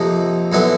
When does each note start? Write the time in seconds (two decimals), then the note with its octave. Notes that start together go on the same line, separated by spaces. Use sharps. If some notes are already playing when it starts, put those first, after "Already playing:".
Already playing: F2 C3 F3 A#3 D#4
0.52 F#2 D3 F#3 B3 E4